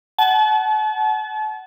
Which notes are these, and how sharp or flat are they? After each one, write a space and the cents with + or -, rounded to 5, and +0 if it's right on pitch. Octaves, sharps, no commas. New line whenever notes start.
F#5 +15 A5 -40